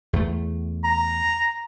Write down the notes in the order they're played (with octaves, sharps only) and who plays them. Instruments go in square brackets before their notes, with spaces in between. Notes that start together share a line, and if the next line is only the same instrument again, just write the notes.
[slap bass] E2 A3
[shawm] A#5